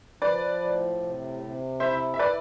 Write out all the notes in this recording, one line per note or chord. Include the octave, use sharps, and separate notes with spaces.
F3 B4 D5
A2
C3
C3
E4 C5 E5
E5
E4 B4 D5